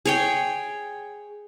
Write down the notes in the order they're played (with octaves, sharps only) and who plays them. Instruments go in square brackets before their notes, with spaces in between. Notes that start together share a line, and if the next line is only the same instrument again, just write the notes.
[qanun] G#4 C#5 G5